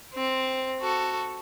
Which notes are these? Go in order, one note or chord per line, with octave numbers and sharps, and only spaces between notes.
C4
F#4 A4